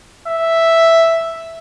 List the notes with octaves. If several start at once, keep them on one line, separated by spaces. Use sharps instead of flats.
E5